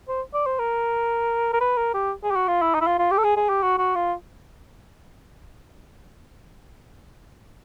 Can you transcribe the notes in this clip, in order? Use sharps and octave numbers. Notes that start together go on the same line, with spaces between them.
C5
D5
C5
A#4
A#4
B4
A#4
G4
G#4
G4
F#4
F4
E4
D#4
E4
F4
F4
G4
A4
G#4
G#4
G4
F#4
F#4
F4